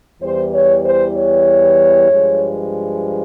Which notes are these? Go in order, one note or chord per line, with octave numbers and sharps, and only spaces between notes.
E2 E3 G3 C5
C#5
C5
C#5
G2 F3 G#3